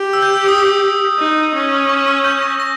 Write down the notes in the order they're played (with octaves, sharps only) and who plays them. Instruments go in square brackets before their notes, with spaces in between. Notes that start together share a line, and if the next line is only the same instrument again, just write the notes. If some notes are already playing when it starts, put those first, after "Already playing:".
Already playing: [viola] G4
[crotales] E6
G6
E6
D#6
[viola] D#4
C#4
[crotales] C#6
E6
G6
A#6
A#6